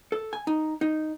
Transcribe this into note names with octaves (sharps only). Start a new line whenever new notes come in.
A4
G#5
D#4
D#4